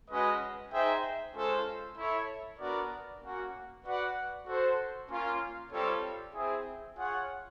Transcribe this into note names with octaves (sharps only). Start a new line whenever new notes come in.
G#3 C#4 F#4 B4 D#5
D#4 G#4 C5 E5 G5
G#3 C#4 F4 A4 C5
E4 A4 C#5 E5
B3 D4 F#4 A#4 D5
A#3 C#4 F#4
F#4 B4 D5 F#5
F#4 A4 C5
A#3 C#4 F4
G3 C4 F4 A4 C#5
C4 E4 G#4
F4 G#4 C#5 F#5